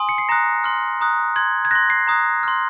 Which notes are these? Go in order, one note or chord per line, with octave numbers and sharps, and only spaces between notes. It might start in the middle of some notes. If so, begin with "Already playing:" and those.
Already playing: G#5 C6 D#6
C#7
C7
A#5 D#6 F#6 A#6
C6 F6
A#5 D#6 F#6
C6 F#6 G#6
G#6
C6 F#6 A#6
C7
A#5 D#6 F#6
C6 F6